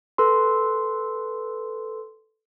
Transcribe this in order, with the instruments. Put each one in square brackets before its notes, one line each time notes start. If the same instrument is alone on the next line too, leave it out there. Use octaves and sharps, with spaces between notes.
[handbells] A4 B4 C6